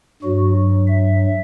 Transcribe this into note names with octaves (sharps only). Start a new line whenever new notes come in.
G2 F#3 F#4
E5